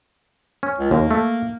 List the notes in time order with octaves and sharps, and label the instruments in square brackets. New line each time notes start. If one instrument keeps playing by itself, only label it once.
[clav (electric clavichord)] C#4
[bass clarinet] C#2
[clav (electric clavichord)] D#2 [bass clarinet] A#3
[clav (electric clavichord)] A3